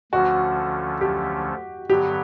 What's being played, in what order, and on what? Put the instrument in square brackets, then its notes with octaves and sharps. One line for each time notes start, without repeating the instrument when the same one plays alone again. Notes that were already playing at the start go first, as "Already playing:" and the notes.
[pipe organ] D2 D3 F3 A3 C#4 [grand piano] F#4
[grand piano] G4
[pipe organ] G2 D3 F#3 B3 [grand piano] G4